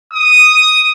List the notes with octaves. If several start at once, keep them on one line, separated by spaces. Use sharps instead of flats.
D#6